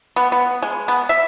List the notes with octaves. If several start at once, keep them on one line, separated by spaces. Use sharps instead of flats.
B3
B3
G#3
B3
E5